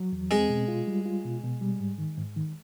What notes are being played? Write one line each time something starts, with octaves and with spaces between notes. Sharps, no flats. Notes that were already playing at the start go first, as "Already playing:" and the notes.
Already playing: F#3
E2
G#3 C4 G#4
B2
F4
G3
F4
B2
B2
G3
G#2
D#3
G#2
D#3